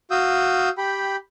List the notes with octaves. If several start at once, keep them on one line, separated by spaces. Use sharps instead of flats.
F#4 F5 D#6 E6 G6
G4 G5 B5